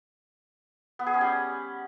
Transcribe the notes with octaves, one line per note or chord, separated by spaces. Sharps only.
B3
G#4
C#4
G3